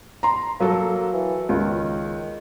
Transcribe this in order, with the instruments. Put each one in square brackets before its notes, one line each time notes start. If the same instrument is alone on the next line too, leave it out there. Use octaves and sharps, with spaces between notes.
[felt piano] A#5 C6
[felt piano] F#3 A4 [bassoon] A#3
[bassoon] E3
[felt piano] C#2 [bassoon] D#3